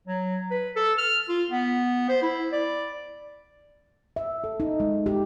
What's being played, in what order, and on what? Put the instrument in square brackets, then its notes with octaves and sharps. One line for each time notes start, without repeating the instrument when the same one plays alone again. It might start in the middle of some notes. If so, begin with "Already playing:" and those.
[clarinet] F#3
B4
A4
F6
F4
B3
C5
E4
D5
[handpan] E5
A4
D#4
G#3
G4